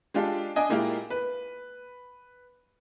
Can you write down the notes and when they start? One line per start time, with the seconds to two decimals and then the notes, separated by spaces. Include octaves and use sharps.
0.14 G#3 D4 F4 G4 A4
0.56 D4 D#5 G#5
0.69 A#2 G#3 A#3 E4 F4 G4
1.10 B4